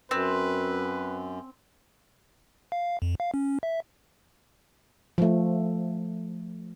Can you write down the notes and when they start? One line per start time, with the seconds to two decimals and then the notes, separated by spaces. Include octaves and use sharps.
0.11 F#2 C4 B4
2.72 F5
3.02 F2
3.20 F5
3.34 C#4
3.63 E5
5.18 F3 A3